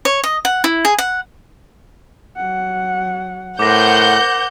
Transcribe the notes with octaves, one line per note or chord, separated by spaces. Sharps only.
C#5
D#5
F#5
E4
G#4
F#5
F#3 F#5
A2 A#4 C5 F#5 D6 G6 A#6